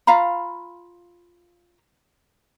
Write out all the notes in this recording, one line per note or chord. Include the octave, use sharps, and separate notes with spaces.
F4 F5 A#5 B5